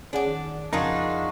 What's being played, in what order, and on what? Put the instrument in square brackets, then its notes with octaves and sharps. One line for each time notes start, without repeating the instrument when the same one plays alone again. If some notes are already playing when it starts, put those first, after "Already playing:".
[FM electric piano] C#4 G#4 F#5 [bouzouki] D4 D5
[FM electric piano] D#3
[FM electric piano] F2 C#3 A#4 [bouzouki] D4 F4 G#4 [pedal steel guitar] D#4 F#4